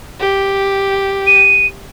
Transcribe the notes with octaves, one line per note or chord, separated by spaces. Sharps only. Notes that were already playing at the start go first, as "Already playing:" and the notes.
G4
D#7